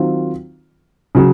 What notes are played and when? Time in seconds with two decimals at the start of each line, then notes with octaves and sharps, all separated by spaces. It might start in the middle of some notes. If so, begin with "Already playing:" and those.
Already playing: D#3 F#3 C4 F4
1.15 C#3 F#3